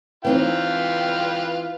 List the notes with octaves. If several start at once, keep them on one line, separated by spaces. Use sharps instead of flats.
E3 C4 D#4 F4 B4 G5